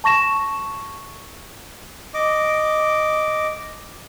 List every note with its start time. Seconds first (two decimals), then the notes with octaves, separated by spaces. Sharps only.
0.04 A5 C#6 A#6 E7
2.14 D#5 D6